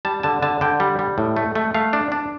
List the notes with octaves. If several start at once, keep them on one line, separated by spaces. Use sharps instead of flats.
G3 A5
D3 A5
D3 A5
D3 G5
G3
G3
A2
A3
A3
A3 F5
D4
D4